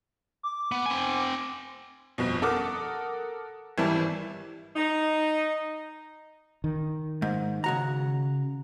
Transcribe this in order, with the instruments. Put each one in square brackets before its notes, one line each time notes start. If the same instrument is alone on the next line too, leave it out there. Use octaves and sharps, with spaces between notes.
[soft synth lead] D6
[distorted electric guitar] B3
C4 G#5
[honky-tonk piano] G1 F2 B2
A4 A#4 F#5 D6 D#6 F6
G#1 E3 G3 E4 A5
[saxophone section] D#4
[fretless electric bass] D#3
[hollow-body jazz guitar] G#2
C#3 F#4 A#5